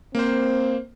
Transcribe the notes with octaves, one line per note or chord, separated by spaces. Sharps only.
A#3 C4 C5